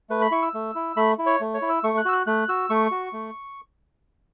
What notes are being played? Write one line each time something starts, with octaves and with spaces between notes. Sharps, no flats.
A3 B4
B5
E4 C#6
E6
A3
E4
A3 B5
E4
C#5
A3
C#5
E4
E6
A3 C#6
F#6
F#4 E6
F#6
A3 F#6
F#4 E6
A3 C#6
F#4
A3